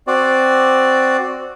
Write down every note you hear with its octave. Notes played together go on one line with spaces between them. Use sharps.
C4 F#4 D5